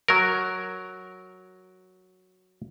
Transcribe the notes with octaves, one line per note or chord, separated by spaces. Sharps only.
F#3 A#4